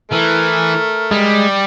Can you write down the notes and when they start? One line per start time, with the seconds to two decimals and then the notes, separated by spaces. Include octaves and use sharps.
0.12 E3 A3 A#4
1.11 G3 G#3